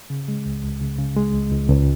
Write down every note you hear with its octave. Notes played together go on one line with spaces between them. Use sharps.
C#3
G#3
C#2
C#2
C#3
C#3
G#3
C#2
C#2
C#2